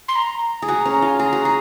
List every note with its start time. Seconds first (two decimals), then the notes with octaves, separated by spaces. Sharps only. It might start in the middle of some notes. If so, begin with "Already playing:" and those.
0.08 C6
0.16 A#5
0.62 G#4
0.68 F#4 G#5
0.81 A#5
0.85 C#4
0.93 A#5
1.02 F4 G#5
1.19 G#4 A#5
1.33 F#4
1.45 G#4